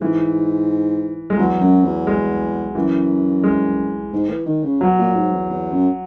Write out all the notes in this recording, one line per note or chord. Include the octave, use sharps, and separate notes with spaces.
G#2 E3
G#3
E2 F#3
F#2
E2
G#3
F#2 E3
G#3
G#2
E3
D#3
C#3
B2 F#3
A#2
G#2
E2
E2
F#2